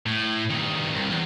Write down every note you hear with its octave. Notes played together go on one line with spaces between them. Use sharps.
A2
G2 D#3
C2
E2